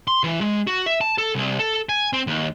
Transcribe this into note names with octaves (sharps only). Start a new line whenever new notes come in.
C6
E3
G#3
F#4
E5
A5
A4
C2
A4
G#5
C4
D#2